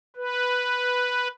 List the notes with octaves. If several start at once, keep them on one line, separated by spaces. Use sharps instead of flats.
B4